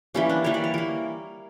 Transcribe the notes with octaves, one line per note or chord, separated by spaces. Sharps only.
E3 G3 A#3 C#4
D4
E3 G3 A#3 C#5
D5
C#5
E3 A#3 A#4